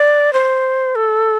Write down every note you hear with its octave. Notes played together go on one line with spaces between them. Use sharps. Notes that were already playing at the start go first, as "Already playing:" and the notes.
Already playing: D5
C5
A4